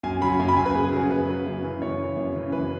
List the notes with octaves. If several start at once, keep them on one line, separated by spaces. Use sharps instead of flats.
F#2 G#5
C#3 F#3 B5
F#2 G#5
B5
C#3 F#3 G#5
B4
F#2 G#4
C#3 F#3 G#4
F#2 B4
C#3 F#3
F#2
C#3 E3
F#2 C#5
C#3 E3
F#2
C#3 E3
F#2 B4